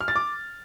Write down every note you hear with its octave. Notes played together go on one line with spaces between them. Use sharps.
F6
A6
D6